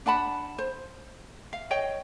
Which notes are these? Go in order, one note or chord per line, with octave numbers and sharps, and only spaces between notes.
D4 F#5 A5 B5
C5
F5
C#5 D#5 G5